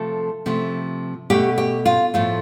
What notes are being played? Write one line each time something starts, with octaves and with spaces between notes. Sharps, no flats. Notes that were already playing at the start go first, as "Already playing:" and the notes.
Already playing: C3 F3 A3 A4
C3 F3 A3
B2 A3 G4
G4
F4
A2 F3 A3 F4